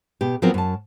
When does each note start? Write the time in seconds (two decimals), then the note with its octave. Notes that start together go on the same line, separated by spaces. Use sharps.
0.21 B2 G4
0.42 F3 F#3 B3 C4 F4 A#4
0.54 F#2 A5